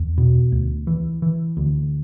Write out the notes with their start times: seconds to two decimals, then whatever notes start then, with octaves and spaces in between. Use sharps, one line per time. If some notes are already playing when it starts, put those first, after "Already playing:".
Already playing: E2
0.18 B2
0.52 D2
0.87 E3
1.22 E3
1.57 D2